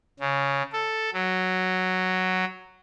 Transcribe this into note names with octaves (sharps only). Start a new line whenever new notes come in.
C#3
A4
F#3